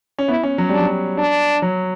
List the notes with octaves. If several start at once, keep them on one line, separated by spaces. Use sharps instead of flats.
C#4
B3 E4
C#4
F#3
G3 D4
F#3
D4
F#3